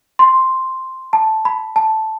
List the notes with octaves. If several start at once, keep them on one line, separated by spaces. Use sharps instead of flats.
C6
A5
B5
A5